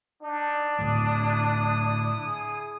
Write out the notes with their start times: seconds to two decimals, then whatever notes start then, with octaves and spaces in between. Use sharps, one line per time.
0.22 D4 D#4
0.79 A2 D3 F#3 E4 D#6
2.26 G#4